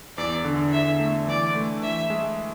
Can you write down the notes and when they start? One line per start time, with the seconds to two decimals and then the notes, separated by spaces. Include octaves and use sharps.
0.17 E2 D5
0.44 D3
0.72 D3 E5
1.00 A3
1.27 E3 D5
1.55 A3
1.82 E3 E5
2.10 G#3